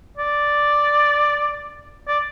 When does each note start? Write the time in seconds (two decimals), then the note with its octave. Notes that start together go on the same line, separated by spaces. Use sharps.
0.18 D5
2.08 D5